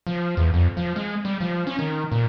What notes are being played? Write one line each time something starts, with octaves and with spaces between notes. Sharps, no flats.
F3
E2
F2
F3
G#3
G3
F3
C#4
D#3
A#2